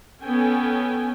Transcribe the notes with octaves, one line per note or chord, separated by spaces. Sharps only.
B3 C#4 A4 G5 G#5